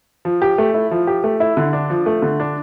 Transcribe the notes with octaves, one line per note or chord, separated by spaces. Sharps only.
F3
G4
A3
E4
F3
G4
A3
E4
D3
D4
F3
A3
D3
D4